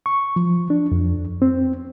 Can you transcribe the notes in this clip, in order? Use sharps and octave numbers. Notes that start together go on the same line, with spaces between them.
C#6
F3
D4
F2
C4